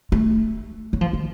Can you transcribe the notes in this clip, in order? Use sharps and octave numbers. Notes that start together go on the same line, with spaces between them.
A3
F#3
F3
D#3